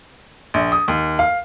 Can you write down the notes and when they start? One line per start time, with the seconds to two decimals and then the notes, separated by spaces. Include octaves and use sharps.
0.54 A#1
0.72 D#6
0.88 D#2
1.19 F5